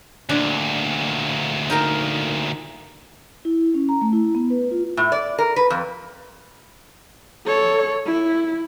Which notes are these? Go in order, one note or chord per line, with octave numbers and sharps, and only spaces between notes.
D2 A#2 D4
D#4 A#4 A#5
E4
C#4
A#5
A3
E4
B3
B4
F4
A2
D5
A#4
B4
F2
A4 C#5
E4